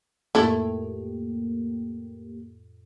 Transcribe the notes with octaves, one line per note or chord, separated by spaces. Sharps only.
F2 A2 A3 A#3 E4 G4 A4